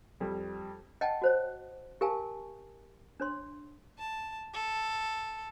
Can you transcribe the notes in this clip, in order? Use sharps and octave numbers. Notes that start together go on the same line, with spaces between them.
F2 G3
D#5 F#5 G5 A5
F#4 C5 C#5
G4 A#4 F5 G#5 A5
D4 C#5 C6
A5
A4